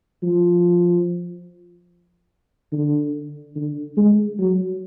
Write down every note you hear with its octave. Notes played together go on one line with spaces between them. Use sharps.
F3
D3
D3
G#3
F#3